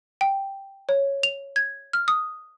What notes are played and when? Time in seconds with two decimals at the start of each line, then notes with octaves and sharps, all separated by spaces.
0.21 G5
0.89 C#5
1.23 F7
1.56 G#6
1.93 F6
2.08 D#6